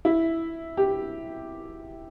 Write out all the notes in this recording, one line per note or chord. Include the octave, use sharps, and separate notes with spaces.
E4
G4